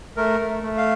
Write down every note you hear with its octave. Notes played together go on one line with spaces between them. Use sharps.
A3 A#4
A3
A3
F5